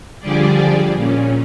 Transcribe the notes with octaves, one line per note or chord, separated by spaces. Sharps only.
D3 F3 G3 G4 G#4 D5
A#2 C#4